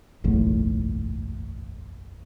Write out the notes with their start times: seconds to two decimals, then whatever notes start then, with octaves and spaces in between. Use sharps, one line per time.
0.24 F#1 B1 E2 A2